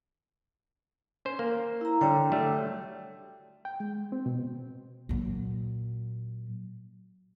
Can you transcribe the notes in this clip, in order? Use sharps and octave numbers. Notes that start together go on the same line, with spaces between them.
C#4 C5
A#3
E4 A#5
D3 G3 C#5 G5
F#3 G3 A3
G5
G#3
C4
B2
A#2 F#3